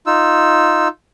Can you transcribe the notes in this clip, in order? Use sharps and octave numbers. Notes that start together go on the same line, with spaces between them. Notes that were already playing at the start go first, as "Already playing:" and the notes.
D#4 F4 E6